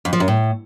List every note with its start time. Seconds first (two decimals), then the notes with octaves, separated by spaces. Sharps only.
0.05 F2
0.13 F3
0.20 F#2
0.28 A2